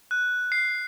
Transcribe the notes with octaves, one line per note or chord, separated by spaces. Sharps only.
F#6
C7